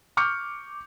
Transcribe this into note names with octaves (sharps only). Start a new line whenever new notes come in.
C#6 D6 F6 G6 C#7